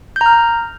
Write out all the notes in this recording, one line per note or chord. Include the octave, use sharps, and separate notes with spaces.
A#5 F6 G6